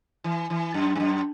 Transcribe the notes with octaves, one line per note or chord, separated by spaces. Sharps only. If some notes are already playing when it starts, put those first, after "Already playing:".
E3
E3
F#2
G2
F#2